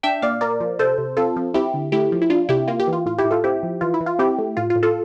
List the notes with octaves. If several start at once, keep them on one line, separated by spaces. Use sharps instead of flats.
D4 E5 G5
A#2 D5 F5
A#3 A#4 D5
F3
C3 A4 C5
C3
C4 F4 A4
F3
C4 E4 G4
D3
A3 E4 G4
F3
E4
D4 F4
C3 E4 G4
A#3 F4
G4
E3
F4
A2 F4
E4 G4
A2
F4 A4
C4 E4 G4
F3
E3 F4
E4
E3
F4
C4 E4 G4
A3
A2 F4
F4
A2
F4 A4